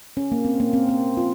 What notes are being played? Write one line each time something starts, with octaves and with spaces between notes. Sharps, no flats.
C#4
A#3
C4
A#3
C4
C4
F4